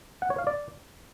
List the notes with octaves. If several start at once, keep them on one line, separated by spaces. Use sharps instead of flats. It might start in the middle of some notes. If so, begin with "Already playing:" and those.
F#5
C#5
F5
D5